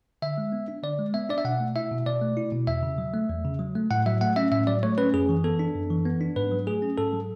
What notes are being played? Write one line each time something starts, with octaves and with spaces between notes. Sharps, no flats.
D3 E5
G#3
B3
D4
D3 D5
G#3
B3 E5
D4 D5
E5
B2 F#5
A3
E4 E5
B2
B2 D5
A3
E4
B2
E2 E5
C#3
F#3
A3
E2
C#3
F#3
A3
A2 F#5
F#3 E5
A3 F#5
C#4 E5
A2 E5
F#3 D5
A3 C#5
C#4 B4
F#2 G#4
E3
B3 A4
D4
F#2
E3
B3
D4
G#2 B4
F#3
A3 G#4
C#4
G#2 A4
F#3